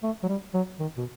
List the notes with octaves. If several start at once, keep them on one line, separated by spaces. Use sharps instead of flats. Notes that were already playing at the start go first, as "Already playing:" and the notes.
A3
F#3
G3
F#3
D#3
B2